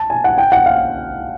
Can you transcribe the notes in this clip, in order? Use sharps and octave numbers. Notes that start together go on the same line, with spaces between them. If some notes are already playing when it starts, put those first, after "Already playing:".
Already playing: A5
G#5
F#5
G5
F#5
F5